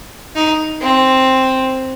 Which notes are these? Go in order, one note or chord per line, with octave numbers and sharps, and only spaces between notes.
D#4
C4